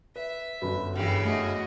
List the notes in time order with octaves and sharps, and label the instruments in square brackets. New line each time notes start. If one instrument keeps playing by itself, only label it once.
[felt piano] B4 [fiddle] E5
[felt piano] G1 F#2 [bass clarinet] B4
[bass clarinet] G2 [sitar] C#3 E3 [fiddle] G#3 G4
[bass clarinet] A3 [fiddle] F#4 D#5